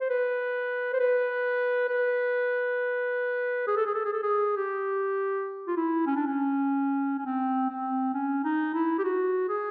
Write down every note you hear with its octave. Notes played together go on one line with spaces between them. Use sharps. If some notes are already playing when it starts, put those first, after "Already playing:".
C5
B4
C5
B4
B4
G#4
A4
G#4
A4
G#4
A4
G#4
G4
F4
E4
C#4
D4
C#4
C#4
C4
C4
C#4
D#4
E4
G4
F#4
G#4